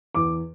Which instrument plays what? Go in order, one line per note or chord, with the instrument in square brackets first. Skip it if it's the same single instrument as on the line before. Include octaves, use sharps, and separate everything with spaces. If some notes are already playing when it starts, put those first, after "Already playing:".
[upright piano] E2 D6